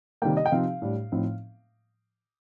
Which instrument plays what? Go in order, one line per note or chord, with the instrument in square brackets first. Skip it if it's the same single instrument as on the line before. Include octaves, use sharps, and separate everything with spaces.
[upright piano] C3 D#3 G3 A#3 G5
D#5
G5
C3 F3 C4 D#4 F5
A2 G3 D4
A2 F3 C4 D#4